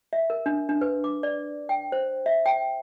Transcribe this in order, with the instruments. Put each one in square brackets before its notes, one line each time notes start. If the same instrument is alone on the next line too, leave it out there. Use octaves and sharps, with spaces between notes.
[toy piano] E5
A#4
D4
D4
B4
D6
D5
G5
C5
E5
G5